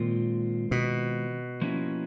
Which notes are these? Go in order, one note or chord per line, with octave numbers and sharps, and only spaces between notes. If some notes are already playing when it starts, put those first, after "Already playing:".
Already playing: A#2 D#3 G#3 C4 F4
B2
F3 A#3 C#4 E4